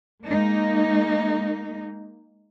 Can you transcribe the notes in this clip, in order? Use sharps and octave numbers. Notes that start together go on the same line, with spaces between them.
G#3 A#3 D#4